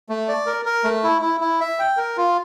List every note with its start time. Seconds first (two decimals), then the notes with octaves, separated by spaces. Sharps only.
0.09 A3
0.28 D5
0.46 A#4
0.65 A#4
0.84 A3
1.04 E4
1.22 E4
1.40 E4
1.61 E5
1.79 G5
1.97 A#4
2.17 F4